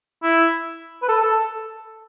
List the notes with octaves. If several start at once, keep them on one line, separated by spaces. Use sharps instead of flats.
E4
B4
A4
A4